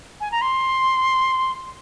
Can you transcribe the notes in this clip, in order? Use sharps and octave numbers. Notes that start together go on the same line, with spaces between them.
G#5
A#5
C6